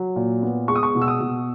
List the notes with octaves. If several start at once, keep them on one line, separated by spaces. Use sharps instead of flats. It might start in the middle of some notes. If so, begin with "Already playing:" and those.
Already playing: F#3
A#2
B3
G#3 C#6
D#6
C#6
B2
E6
D#6
B2